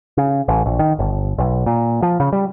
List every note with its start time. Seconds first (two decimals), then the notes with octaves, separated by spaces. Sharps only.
0.17 C#3
0.48 A1
0.66 A#1
0.79 D#3
0.99 G1
1.38 B1
1.66 A#2
2.02 F3
2.20 C#3
2.33 G3